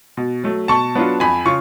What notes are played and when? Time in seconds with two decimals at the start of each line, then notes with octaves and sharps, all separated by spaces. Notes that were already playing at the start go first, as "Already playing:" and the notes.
0.17 B2
0.44 F#3 A3
0.68 B2 A5 C#6
0.95 F#3 B3 D4 F4
1.20 F2 G#5 B5
1.46 C#3 F4 C#6